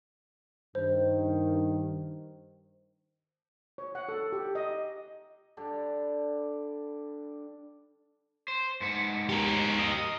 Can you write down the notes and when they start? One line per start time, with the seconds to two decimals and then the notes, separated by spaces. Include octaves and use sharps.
0.75 G2 D#3 C5
3.78 C#5
3.95 F#5
4.09 A4
4.32 G4
4.55 D#5
5.57 D3 G3 D4 G4
8.48 C5
8.81 G#2 B4 F#5
9.29 G4 A#4
9.79 D#5